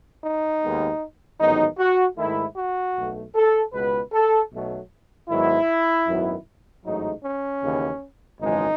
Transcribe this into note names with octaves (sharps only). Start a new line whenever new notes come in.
D#4
D#2 D#3 G#3 B3
A1 G#2 D#3 F#3 B3 D#4
F#4
G#2 D#3 A3 E4
F#4
B1 B2 A3
A4
C#2 B2 G#3 B3 B4
A4
B1 B2 F#3 A3
G#2 D#3 F#3 B3 E4
G#1 F#2 D#3 F#3 B3
A1 G#2 F#3 A3 D#4
C#4
D#2 C#3 E3
G#1 F#2 C#3 E3 G#3 D#4